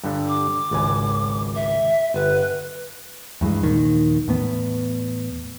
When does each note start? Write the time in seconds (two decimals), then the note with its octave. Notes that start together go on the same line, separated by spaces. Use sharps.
0.04 G2 D3
0.28 D6
0.71 G#1 C#2 G#5
1.55 E5
2.14 G1 B4
3.41 E2 G2 E3 G#3
3.63 A#1 D#2 D#3
4.28 E2 A2 B3